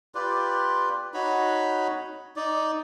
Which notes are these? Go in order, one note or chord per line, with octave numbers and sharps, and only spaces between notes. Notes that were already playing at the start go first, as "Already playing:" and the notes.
F4 G4 B4 D5
D#4 F#4 C#5 B5
D#4 D5